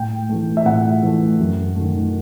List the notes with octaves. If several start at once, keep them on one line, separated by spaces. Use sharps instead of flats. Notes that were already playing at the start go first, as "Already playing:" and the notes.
Already playing: A2 G5
E3 A3
E5
A2 F#5
E3 A3
F#2
D#3 A3